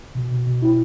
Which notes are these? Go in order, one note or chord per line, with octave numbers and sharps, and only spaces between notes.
B2
B2
B2
E4